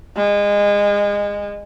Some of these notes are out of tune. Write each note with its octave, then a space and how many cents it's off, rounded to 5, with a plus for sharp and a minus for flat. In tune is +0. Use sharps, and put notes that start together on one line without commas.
G#3 -25